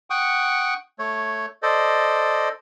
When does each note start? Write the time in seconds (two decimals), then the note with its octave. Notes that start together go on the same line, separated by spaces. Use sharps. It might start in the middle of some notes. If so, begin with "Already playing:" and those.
0.10 F#5 G5 C#6 D#6
0.99 A3 C#5
1.63 A4 C5 D5 D#5